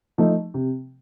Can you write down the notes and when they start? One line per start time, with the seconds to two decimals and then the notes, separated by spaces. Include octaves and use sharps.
0.18 F3 A3 D#4
0.54 C3